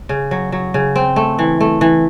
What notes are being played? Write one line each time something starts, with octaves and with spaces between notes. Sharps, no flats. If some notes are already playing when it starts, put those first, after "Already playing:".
C#3
F#3
F#3
C#3
C4
A3
E3
A3
E3